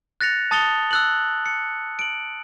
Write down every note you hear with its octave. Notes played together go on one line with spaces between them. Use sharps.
F#6 A6 A#6 C#7 F7
A5 D#6 A6 C#7 F7 G7
E6 F#6 F#7
C#7
D7 F#7